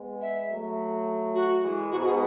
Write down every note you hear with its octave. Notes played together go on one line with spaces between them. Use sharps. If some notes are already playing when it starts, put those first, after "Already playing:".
Already playing: G#3 B3
E5
F#3 A3
F#4
E3 G#3
G#2 B2 F#4
G#4